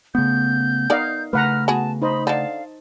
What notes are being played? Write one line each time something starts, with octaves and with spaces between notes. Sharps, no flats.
C#3 A3 B3 G6
B3 D#4 A#4 D5 D#5 F5
C#3 A3 B4 F#5 A#5 F6
B3 F#4 G#4 A5
D#4 C5 D#5 B5
D3 D#4 F5 A5